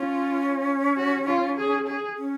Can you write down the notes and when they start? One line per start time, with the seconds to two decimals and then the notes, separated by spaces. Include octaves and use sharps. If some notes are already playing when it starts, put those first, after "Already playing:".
Already playing: C#4 F4
0.97 F#4
1.27 F4
1.57 G#4
1.87 G#4
2.18 C#4